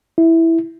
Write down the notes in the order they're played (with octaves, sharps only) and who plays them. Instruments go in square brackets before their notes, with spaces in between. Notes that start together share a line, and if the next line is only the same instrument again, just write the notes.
[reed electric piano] E4